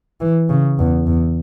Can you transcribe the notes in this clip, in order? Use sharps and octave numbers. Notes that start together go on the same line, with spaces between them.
E3
C#3
E2
E2